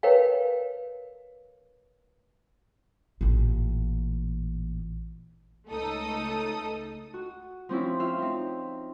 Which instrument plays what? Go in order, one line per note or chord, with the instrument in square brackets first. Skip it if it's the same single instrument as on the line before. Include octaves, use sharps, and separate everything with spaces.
[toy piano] A#4 B4 C#5 F5 G5
[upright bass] A1 A#2
[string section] C#2 A3 D#4 A4 D#6
[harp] F#4
F3 C4 C#4 E4
F4 E5 F5
C4 D#4